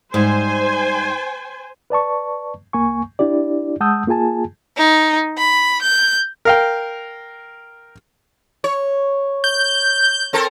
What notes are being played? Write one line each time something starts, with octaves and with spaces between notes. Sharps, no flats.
G#2 G3 C5 G#5
B4 D5 A5 C#6
C2 A#3 G#5 C#6
D4 E4 G4 D5
G#3 F#5 A5 D#6 E6 G6
A#3 F4 G#4 G#5 A5
D#4
B5
G6
A#4 F5 G5
C#5
G6
C4 A4 A#4